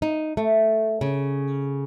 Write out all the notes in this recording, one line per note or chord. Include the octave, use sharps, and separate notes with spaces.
D#4
A3
C#3